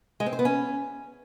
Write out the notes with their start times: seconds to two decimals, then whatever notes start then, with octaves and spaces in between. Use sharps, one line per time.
0.20 G#3
0.26 C4
0.33 C5
0.39 B3
0.45 C#4